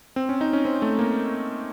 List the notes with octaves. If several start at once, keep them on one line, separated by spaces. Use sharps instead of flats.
C4
C#4
D#4
C#4
C4
A3
A#3